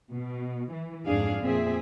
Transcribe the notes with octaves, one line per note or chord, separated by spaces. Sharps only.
B2
E3
F2 G#2 D4 G#4 F5
F2 A#2 C4 G#4 E5